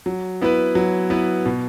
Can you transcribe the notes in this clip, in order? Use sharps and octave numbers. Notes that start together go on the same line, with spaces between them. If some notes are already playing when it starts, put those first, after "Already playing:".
F#3
B3 E4 B4
F#3
B3 E4 B4
B2